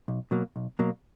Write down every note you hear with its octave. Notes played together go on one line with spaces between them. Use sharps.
B1
B2 F#3 A#3
B1
B2 F#3 A#3